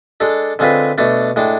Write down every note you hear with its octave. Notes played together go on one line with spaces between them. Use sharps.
G#3 D4 A4 D5
D3 G#3 C4 F4 B4
B2 A3 D4
A2 G#3 D4